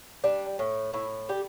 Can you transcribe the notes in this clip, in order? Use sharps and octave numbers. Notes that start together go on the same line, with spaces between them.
G3 D4
A2
A2 E4
G3 G4